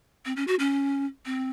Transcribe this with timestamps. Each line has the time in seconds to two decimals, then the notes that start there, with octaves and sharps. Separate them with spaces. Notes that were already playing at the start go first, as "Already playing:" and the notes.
0.25 C4
0.36 C#4
0.47 F#4
0.59 C#4
1.25 C4